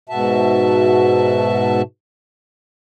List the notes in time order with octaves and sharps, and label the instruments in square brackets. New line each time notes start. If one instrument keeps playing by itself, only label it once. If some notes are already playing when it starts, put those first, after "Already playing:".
[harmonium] G#2 B2 F#4 E5 A5